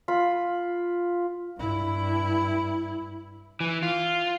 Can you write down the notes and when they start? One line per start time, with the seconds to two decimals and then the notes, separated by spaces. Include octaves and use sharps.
0.08 F4 B5
1.58 G2 E4
3.60 E3
3.83 F4